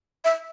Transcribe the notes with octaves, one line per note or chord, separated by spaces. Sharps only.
E5